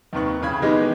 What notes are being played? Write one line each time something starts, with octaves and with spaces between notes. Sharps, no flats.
D#2 C3 D#3 B4 C#6 F#6
A1 C#3 B5 G#6
B2 D#3 E3 G#3 D#4 G4